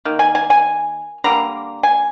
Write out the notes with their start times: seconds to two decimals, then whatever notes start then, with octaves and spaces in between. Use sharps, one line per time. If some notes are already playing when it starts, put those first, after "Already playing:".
0.05 D#3 A#3
0.19 G#5
0.35 G#5
0.50 G#5
1.24 D3 G3 A#3 A#5
1.83 G#5